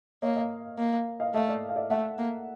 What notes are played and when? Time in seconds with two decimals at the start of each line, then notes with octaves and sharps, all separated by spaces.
0.22 A#3 C#5 D#5
0.36 D#5 F5
0.78 A#3
1.20 D#5 F5
1.34 A3 D#5 F5
1.48 D5 E5
1.69 F5
1.76 D5 E5
1.90 A3 E5 F#5
2.18 A#3